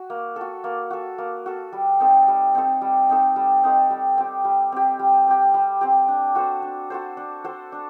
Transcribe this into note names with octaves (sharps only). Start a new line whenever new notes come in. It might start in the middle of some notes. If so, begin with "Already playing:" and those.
Already playing: F#4
A#3
F#4 A4
A#3
F#4 A4
A#3
F#4 A4
G3
C4 D#4 A4
G3
C4 D#4 A4
G3
C4 D#4 A4
G3
C4 D#4 A4
G3
C4 G4
G3
C4 G4
G3
C4 G4
G3
C4 G4
D4
F#4 A4 C5
D4
F#4 A4 C5
D4
F#4 A4 C5
D4